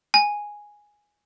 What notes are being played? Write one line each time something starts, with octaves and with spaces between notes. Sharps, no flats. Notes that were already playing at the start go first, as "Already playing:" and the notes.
G#5